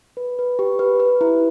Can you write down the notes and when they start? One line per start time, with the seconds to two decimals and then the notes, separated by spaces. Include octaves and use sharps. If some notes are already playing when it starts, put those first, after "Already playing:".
0.17 B4
0.39 B4
0.59 G4
0.79 B4
1.00 B4
1.21 E4